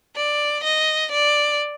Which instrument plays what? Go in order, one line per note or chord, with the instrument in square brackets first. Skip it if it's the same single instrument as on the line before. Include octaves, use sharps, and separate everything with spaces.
[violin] D5
D#5
D5